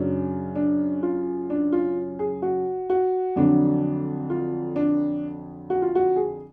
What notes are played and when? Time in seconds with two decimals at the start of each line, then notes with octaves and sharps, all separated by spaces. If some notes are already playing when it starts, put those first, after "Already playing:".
Already playing: F#2 C#3 F#3 D4
0.55 D4
1.03 F4
1.50 D4
1.72 F4
2.19 G#4
2.42 F#4
2.90 F#4
3.36 F2 D3 F#3 D4
4.30 F4
4.76 D4
5.70 F#4
5.82 F4
5.95 F#4
6.16 G#4